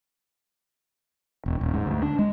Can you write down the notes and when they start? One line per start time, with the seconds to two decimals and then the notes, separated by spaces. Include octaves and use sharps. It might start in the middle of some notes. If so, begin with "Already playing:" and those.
1.46 E1
1.61 D#1
1.73 G#2
1.86 D2
2.02 D4
2.19 G#3